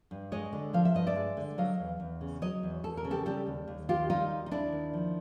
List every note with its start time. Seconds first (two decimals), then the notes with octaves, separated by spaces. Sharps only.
0.11 G2
0.32 G#3 C#5 D#5
0.53 D3
0.73 F3 F5
0.85 E5
0.95 G2 D#5
1.07 D5 E5
1.16 G#3
1.37 D3
1.58 F#3 D#5 F5
1.79 E2
2.00 E2
2.21 C#3
2.42 F#3 C#5 D#5
2.63 E2
2.84 E2 A4
2.97 A#4
3.05 C#3
3.11 G4 A4
3.26 G3 G4 A4
3.47 D#2
3.68 D#2
3.89 D#3 F4 G4
4.10 G3 D#4 F4
4.30 D#2
4.46 D#4
4.51 D#2 D4 E4
4.72 D#3
4.93 F3